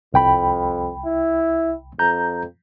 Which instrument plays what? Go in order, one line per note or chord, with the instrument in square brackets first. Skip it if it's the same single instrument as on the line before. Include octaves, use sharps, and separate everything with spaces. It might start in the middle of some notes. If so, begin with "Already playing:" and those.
[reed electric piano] C2 G5 B5 [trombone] F2
[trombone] E4
[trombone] F2 [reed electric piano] A#5 G6